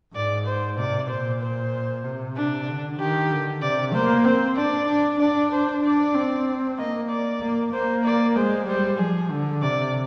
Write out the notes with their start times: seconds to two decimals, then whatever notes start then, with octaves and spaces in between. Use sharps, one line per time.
0.15 G#2 D5
0.47 C5
0.79 C3 D5
1.10 A#2 C5
1.42 C5
2.05 C3
2.37 D4
2.68 D3
2.99 D#3 G4
3.31 D3
3.63 C3 D5
3.94 A#3 C5
4.25 C4 C5
4.58 D4 D5
4.89 D4
5.20 D4 D5
5.52 C5
5.84 D4 D5
6.15 C4
6.78 A#3 D#5
7.10 D5
7.42 A#3
7.73 A#3 C5
8.05 D5
8.36 G#3 C5
8.67 G3 C5
8.99 F3 G#4
9.30 D3
9.63 C3 D5